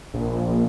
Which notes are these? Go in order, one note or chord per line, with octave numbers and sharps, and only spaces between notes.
A#1